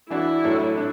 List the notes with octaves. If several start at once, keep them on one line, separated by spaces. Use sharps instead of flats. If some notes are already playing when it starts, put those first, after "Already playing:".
E3 D4 E4 F#4 D5
A2 F#3 D4 A4
D4